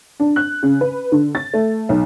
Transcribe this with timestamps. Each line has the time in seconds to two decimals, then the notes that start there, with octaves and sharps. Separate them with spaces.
0.20 D4
0.36 F#6
0.63 C#3
0.81 B4
1.12 D3
1.35 A6
1.54 A3
1.89 B1